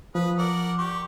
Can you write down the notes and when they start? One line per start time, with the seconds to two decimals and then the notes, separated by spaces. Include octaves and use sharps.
0.15 F3 B4 B5 D#6
0.38 A#4 D5 F#5
0.78 G4 C#6